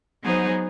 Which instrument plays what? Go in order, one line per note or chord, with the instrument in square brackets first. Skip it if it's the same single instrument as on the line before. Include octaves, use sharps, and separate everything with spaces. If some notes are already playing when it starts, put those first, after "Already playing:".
[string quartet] F#3 B3 D#4 G#4 C5